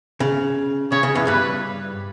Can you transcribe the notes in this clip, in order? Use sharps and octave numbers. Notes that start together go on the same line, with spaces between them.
C#3
C#3 C#5
C#3
E2 E3
G2 G3 B4